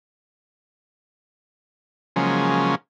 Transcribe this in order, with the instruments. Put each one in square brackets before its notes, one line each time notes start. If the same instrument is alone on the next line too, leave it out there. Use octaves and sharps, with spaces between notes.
[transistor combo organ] C#3 F3 F#3 G#3 A#3 C#4